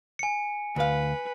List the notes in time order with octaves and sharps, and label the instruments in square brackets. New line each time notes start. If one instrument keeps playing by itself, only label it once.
[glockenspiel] G#5 C#7
[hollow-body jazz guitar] D2 F5 [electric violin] B4